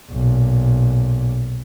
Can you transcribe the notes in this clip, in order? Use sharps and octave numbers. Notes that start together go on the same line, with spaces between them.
B1 A#2